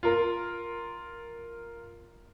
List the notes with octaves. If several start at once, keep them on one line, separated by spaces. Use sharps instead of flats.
F4 A#4